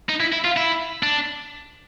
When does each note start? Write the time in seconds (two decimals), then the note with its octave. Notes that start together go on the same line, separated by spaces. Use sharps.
0.09 D#4
0.20 E4
0.32 E4
0.44 F4
0.56 E4
1.03 D4